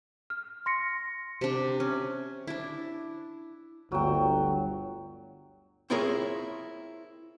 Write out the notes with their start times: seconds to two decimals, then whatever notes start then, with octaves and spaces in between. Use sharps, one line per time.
0.30 F6
0.66 C6 A#6 C#7
1.41 C3 D4
1.80 C#4
2.47 D4 E4
3.92 G1 D2 F#3 G5
5.90 C4 E4 F4 G#4 A#4 C#5